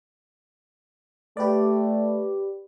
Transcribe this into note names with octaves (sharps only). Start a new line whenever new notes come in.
A3 G4 B4 D5